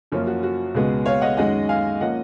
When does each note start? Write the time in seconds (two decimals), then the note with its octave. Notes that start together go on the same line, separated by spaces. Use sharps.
0.12 F#2 F3 A#3 C#4 F4
0.27 F#4
0.43 F#4
0.75 C#2 B2 G#3 B3
1.06 C#5 F5
1.21 D#5 F#5
1.37 F#2 D#3 G#3 C#4 D#5 F#5
1.69 F5 G#5
2.00 F3 A#3 C#4 D#5 F#5